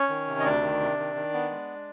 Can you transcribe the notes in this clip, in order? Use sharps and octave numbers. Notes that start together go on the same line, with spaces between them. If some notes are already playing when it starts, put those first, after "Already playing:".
Already playing: C#4 C#5
D#3
C3
D#5
D2 D4 D5
D#3
C3
D#3
D#3
B3
G#3